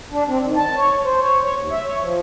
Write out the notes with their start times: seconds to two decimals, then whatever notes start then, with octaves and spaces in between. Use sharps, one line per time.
0.12 D4
0.29 C4
0.42 D#3
0.56 A5
0.76 C#5
1.05 C5
1.21 C#5
1.43 C#5
1.59 D#2
1.72 E5
1.85 C#5
2.02 F3